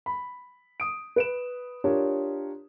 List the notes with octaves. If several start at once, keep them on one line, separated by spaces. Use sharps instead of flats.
B5
D#6 D7
B4 D7 E7
D4 F4 G4 A#4 C#5